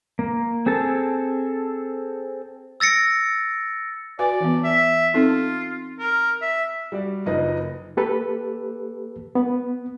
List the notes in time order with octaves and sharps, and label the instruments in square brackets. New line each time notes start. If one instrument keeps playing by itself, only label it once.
[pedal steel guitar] A#3
C4 G#4 A4 A5
[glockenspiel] E6 A6 A#6 C#7 D7
[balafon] F#4 B4 G#5 [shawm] D5
[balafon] E3 B3
[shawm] E5
[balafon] C4 D#4 A4 [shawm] F4
[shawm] A#4
E5
[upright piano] G3 F#4 D5
F#1 F3 A#3 D#4 B4 D#5
[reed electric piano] A#3 G4 A4 B4
B3